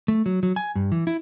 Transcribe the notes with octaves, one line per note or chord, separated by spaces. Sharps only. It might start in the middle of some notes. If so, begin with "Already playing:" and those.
A3
F#3
F#3
G#5
G2
E3
E4